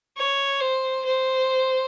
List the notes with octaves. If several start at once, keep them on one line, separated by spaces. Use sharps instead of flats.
C#5
C5
C5